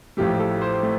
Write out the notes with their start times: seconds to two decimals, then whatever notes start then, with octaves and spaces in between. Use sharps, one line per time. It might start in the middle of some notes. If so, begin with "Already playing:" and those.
0.17 A1 A2 F3 A3 G4
0.40 A4
0.61 C5
0.83 A3